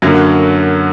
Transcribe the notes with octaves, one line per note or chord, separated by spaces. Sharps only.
F#2 D3 F#3 A#3